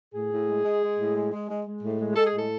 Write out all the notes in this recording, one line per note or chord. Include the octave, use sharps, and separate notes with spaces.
A2 G#4
A2
G#3
G#3
G#3
A2
G#3
G#3
G#3
G#3
A2
G#3
G#3 A4
G#4
A2 A4